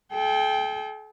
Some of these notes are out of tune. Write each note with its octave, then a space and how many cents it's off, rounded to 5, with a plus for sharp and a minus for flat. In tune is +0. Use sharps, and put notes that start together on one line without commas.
A4 -45 G5 +5